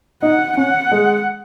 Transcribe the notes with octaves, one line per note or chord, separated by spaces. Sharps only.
D#4 F#5
C#4 F#5
G#3